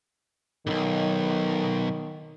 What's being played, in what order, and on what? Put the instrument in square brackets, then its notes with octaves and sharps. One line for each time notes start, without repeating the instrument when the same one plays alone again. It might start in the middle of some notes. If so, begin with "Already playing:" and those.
[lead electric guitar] B1 G#2 [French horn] D#3